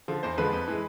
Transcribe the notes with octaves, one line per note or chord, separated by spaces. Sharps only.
D3 F3
E2 C5
D3 F3 G#3 B4
F2
E3 G#3